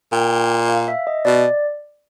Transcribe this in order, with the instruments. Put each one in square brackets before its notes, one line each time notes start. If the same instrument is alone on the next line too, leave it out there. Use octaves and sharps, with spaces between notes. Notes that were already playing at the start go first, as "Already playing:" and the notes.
[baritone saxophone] A#2 [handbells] G5
[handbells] F5
E5
D#5
[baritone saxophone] B2 [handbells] D5